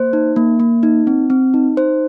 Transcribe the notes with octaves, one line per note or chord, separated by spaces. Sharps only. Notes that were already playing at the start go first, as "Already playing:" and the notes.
Already playing: A#3 C5
D#4
A#3
A#3
D#4
C4
C4
D#4
D#4 C5